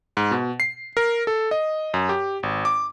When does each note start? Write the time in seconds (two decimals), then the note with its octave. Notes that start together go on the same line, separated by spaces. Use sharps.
0.17 G#2
0.31 B2
0.60 C7
0.97 A#4
1.27 A4
1.51 D#5
1.94 F#2
2.09 G4
2.43 G#1
2.65 D6